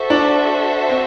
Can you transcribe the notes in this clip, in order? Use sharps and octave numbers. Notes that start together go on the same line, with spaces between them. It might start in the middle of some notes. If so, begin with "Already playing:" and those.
Already playing: F#4 A4 C5 E5
D4
C4